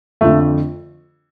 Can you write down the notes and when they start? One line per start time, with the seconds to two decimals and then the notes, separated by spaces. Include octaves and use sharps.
0.21 F2 D3 F3 A3